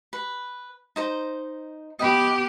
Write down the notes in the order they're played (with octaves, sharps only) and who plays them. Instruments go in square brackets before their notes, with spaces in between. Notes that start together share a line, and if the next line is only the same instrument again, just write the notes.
[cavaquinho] B4
D#4 C5 A#5
[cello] B3 G4 [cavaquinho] D#5 G5 B5